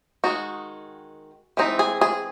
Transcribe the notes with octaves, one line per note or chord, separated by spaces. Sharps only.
D#3 G#3 D#4 F#4
E3 G#3 C4 D#4
G#4
G#4